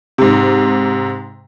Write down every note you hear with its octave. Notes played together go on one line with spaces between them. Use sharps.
G#2 C3